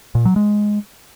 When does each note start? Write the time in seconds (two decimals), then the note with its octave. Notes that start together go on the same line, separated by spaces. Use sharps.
0.15 A#2
0.25 F#3
0.36 G#3